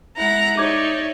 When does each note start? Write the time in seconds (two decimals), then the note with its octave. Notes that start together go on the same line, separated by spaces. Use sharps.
0.17 G#3 E4 F#5 A#5
0.57 D#4 C#5 D5 E5 D6 G#6